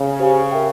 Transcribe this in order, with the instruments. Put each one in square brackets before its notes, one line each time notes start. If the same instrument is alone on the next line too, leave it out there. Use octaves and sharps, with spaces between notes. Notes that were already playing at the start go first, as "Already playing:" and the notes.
Already playing: [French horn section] C#3
[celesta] G4 C5 F5 G#5
A#4 E5 G5